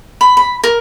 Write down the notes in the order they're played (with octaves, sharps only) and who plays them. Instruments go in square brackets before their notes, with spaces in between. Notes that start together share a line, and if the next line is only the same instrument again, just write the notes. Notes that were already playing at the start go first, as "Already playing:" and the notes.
[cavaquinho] B5
B5
A#4